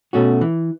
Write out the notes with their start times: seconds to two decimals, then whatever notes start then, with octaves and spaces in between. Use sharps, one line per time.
0.13 B2 A3 C#4 F#4
0.41 E3